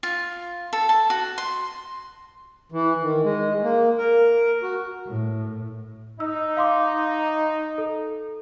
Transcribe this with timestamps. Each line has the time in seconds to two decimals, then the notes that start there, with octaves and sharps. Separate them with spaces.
0.03 F4
0.73 A4
0.89 A5
1.10 F#4
1.38 C6
2.72 E3
3.03 D#3
3.24 G#3
3.63 A#3
3.98 A#4
4.63 F#4
5.07 A2
6.20 D#4 E6
6.57 F5 C6 D6
7.78 A4